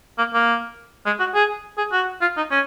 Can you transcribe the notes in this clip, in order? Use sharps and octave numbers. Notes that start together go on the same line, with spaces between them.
A#3
A#3
G#3
F#4
G#4
G#4
F#4
F4
D#4
C#4